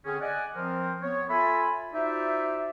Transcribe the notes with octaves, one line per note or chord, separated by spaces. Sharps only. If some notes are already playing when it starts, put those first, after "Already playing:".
D3 C4 C#4 G#4
D5 D#5 F#5 G#5
F3 C4 A#4 C5
B3 C#5
F4 A4 E5 G#5 B5
D#4 F4 F#4 C5 D5 E5